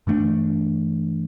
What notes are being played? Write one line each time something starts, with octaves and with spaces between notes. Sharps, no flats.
G2 E3 A3 D4